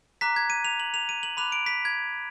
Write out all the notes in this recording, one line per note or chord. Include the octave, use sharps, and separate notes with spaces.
A#5 D6 F#6 B6
G#6
D#7
F7
F#7
F7
D#7
F#7
B5 D6 F#6 F7
D7
B6
G#6